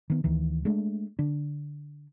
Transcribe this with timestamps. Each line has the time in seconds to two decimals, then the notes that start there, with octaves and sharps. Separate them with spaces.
0.10 D#3 B3
0.24 D2 D#3 E3
0.65 G#3 A3 D4
1.19 D3 D4